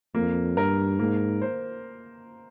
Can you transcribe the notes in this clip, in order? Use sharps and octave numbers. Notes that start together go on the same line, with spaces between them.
F2 A#3
G2 A#4
G#2 A#3
C5